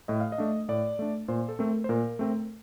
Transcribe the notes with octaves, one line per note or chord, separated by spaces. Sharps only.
A2 D#5
F5
D#5
A3 D4
A2 D5
A3 D4
A#2 C5
A4
A3 C4 A#4
C5
A#2 A#4
A3 C4